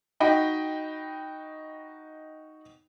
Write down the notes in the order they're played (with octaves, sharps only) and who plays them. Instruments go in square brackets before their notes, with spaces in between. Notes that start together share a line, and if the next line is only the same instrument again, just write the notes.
[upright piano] D#4 F#4 D#5 G5 B5